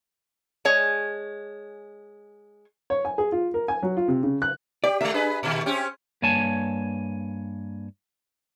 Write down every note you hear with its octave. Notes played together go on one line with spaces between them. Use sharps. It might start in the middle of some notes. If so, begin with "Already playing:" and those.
G#3 C#5 G#5
C#5
G#5
G#4
F4
A#4
G#5
F#3
F4
C3
C#3
F#6
G4 D5
G#3 A3 E5
D4 G#4 B4
A#2 D#3
C4 C#4 G4
G2 A#3 C#5 G#5 A5